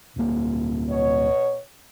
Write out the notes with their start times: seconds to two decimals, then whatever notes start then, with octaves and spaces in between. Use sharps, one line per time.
0.16 D1 A#3
0.90 B2 C#5